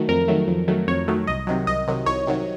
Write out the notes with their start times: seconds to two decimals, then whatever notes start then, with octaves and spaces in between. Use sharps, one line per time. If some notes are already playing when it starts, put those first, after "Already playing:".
Already playing: D#3 F#3 A3
0.08 F2 A#4
0.28 D#3 F#3 A3
0.48 F2
0.68 D#3 F#3 A3
0.87 F2 C#5
1.08 D#3 F#3 A3
1.27 C2 D#5
1.47 C3 D#3 F#3
1.67 C2 D#5
1.87 C3 D#3 F#3
2.06 C2 C#5
2.27 C3 D#3 F#3